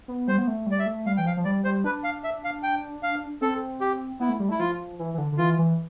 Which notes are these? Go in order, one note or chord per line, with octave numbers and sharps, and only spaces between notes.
B3
G3 C5
B3
A3
G3 D5
E5
A3
G3 F5
E3 G5
F3 F5
F3
G3 D5
G3 C5
D4 B4
F5
E5
F5
G5
F5
C4 A4
G4
B3 E4
A3
G3
A3 E4
F3 F4
E3
E3
D3
D3
E3 F4
E3